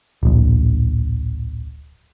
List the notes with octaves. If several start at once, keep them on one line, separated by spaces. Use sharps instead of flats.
D1 A#1